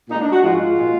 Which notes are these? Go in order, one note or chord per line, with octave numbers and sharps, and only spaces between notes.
A#2 G#3 D#4
D4
F#4
G#2 F3 G#3 F4
A#2 G#3